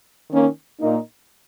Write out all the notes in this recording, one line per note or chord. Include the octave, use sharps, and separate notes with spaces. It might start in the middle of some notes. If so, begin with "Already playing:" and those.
D#3 A#3 C#4
A#2 A#3 D#4